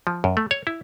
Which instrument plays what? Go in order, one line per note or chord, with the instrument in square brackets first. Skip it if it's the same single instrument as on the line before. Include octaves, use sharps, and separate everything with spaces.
[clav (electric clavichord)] F3
F#2
A3
C#5
E4